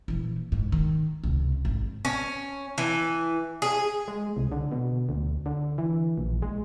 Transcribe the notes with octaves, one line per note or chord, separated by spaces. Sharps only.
A#2 E3
G#2
D#3
C#2 C3
G#1
C#4
E3
G#4
G#3
C2
D3
B2
D2
D3
E3
A#1
G#3